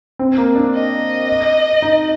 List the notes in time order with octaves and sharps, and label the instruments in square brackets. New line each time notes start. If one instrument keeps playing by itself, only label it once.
[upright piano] C4
A#3
D4
[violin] D#5
[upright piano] D#4